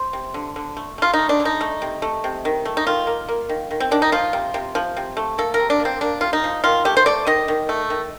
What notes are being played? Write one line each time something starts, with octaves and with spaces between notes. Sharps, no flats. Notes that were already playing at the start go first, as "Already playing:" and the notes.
Already playing: C5
C3
D3
D3
A3
A3 F4
D#4
A3
D4
D3
D#4
A3
C3
A3
C3
D#3
A3
D#4
D#3 F4
A#3
A#3
D#3
D#3
C4
D#3 D4
D#4
F3 F4
C3
C3
F3
C3
A3
A#3 A4
A#4
C3
D4
A#3
C4
A#3 D4
C3 F4
D#4
F3
D#3 F4
A3 G4
C5
A3 D5
D#3 D#5
D#3
A3
D#3